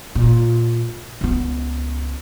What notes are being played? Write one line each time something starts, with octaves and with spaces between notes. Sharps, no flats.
A#2
C#2 B3